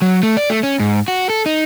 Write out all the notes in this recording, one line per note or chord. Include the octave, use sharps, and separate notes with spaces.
F#3
A3
D5
A3
C#4
G#2
F#4
A4
D#4